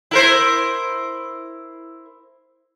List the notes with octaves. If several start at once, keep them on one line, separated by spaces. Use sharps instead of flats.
E4 A#4 C5